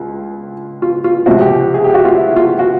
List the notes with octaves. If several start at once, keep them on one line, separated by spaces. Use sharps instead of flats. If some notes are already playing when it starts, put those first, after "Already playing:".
Already playing: C#2 F4
F4
F4
C#2 C3 F3 F#4
G4
G#4
G4
F#4
F4
E4
F4
F#4